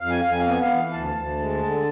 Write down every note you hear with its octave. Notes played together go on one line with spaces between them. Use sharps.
F2 F5
G#5
F2 F5
G#5
F5
B3 G#5
F5
E3
D2 A5
D2
G#3
D3